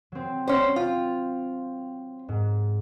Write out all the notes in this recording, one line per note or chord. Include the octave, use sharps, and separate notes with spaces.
F#3 C4
C#4 C5
C4 F4
G#2